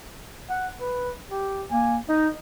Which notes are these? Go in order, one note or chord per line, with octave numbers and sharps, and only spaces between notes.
F#5
B4
G4
A#3 G#5
D#4 D#5